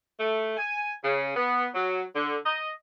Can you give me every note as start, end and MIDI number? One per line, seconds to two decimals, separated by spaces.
0.20 0.55 57
0.57 0.92 80
1.04 1.35 49
1.37 1.67 59
1.74 2.04 54
2.16 2.37 50
2.46 2.70 75